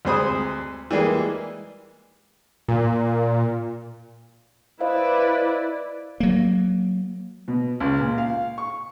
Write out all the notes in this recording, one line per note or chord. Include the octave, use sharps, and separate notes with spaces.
D2 C3 G#3 C5 B5 D#6
E3 G3 G#3 A#3
A#2
E4 B4 C5 D5 D#5 F5
F#3 A#3
B2
C#2
A#2
F5
C#6